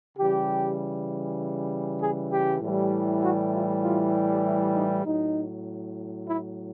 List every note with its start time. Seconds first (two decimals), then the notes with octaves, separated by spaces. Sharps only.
0.16 C#3 E3 G3 G4
2.01 G#4
2.30 G4
2.61 A2 E3 G3
3.22 F#4
3.52 F4
3.83 F4
4.45 E4
4.75 D#4
5.05 A2 F#3 D#4
6.27 E4